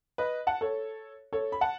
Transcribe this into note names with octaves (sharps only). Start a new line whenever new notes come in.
B4 D#5
F#5 A5
A4 C#5
A4 C#5
B5
F#5 A5